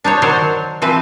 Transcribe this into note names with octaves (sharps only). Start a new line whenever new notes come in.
D4 D#4 C5 C#5
D#3 F#3 D4 C5 C#5
E3 F3 C4 B4